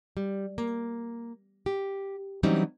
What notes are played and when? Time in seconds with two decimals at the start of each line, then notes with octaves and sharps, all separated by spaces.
0.17 G3
0.58 A#3
1.66 G4
2.43 E3 F#3 G3 C4 C#4 D#4